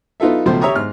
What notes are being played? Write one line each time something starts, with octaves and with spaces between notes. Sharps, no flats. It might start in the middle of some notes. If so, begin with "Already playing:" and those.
B3 D#4 F4 A4 E5
C#2 B2 F3 A3 C5
G4 C#5 E5 A#5 C#6 D#6
G#2 F6